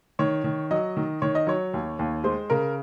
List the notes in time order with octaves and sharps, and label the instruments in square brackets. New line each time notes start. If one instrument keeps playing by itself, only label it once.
[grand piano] D#3 [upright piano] C#5
[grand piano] D#3
[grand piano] F#3 [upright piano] D#5
[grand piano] D#3
[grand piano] D#3 [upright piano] C#5
[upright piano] D#5
[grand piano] F#3 [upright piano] C#5
[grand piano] D#2
D#2
[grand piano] G#3 [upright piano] C5
[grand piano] C#3 [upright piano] A#4